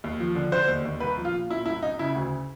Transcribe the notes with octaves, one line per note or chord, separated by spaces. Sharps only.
D#2
F3
D3
D3 C5
D#2
D#2
C2 B4
F3
F4
A#2
A#2 E4
C2 E4
C2 D#4
C#3 E4
D2